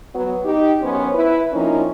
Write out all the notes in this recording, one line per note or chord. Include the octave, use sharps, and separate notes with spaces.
F#3 B3
D#4 G4
F#2 B3 C#4 C5 C#5
E4 B4
F3 A#3 C4 C#4 D#4 E4